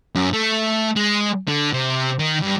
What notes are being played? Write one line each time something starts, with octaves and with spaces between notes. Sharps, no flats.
F#2
A3
G#3
D3
C3
D#3
G2